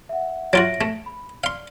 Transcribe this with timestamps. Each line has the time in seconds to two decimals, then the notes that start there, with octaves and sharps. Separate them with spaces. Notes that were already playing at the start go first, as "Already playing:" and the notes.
0.09 E5 F#5
0.53 F#3 F4 F#4 E5 A#6 D7
0.81 A3
1.06 B5
1.44 D5 F5 C6